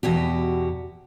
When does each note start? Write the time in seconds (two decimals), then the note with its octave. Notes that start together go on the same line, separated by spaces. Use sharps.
0.03 E2 B2 F#4 G4